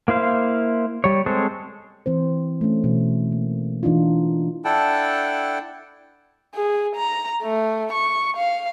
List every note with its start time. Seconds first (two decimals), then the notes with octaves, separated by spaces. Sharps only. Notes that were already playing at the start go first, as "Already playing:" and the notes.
0.08 A#3 E4 C5 F5
1.04 G3 C#5
1.26 G#3 C4 A4 C5 C#5
2.06 E3 C4 C5
2.61 A3 C#4
2.84 B2 E3
3.32 A#3
3.83 E3 D4 D#4 F4
4.65 D4 E4 A4 F#5 G5 A5
6.55 G#4
6.96 A#5
7.42 A3
7.93 C#6
8.37 F5